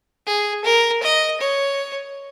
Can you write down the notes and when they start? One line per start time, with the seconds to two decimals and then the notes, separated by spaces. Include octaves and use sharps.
0.27 G#4
0.65 A#4
1.03 D#5
1.41 C#5